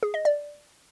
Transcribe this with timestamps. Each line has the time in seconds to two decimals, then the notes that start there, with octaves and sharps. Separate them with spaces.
0.03 G#4
0.14 D#5
0.25 D5